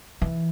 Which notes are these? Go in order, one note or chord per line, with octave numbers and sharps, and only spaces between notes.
E3